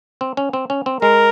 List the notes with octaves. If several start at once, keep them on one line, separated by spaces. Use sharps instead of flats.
C4
C#4
C4
C#4
C4
G#3 A#4